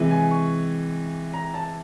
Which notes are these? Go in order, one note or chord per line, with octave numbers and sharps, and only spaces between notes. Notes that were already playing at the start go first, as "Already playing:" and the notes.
Already playing: C3 E3 G#3
G#5
C#6
A#5
A5